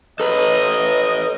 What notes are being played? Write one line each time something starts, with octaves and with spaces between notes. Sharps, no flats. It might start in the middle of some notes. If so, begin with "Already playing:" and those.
A4 B4 D#5